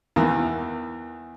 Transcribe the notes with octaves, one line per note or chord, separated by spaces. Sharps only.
E2 D#3 E3